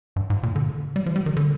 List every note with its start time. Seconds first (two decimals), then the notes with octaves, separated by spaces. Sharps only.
0.16 G2
0.30 G#2
0.43 A#2
0.56 D3
0.96 G3
1.06 F3
1.16 G3
1.26 D#3
1.37 D3